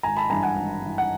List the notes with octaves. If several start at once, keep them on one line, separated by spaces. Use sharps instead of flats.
G#1 G#5 A#5
A5 B5
G2 E3 G#5 A#5
F#5 G#5
G#1
G2 E3
F#5